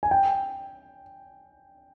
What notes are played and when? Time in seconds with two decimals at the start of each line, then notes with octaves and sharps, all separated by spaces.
0.03 G#5
0.11 G5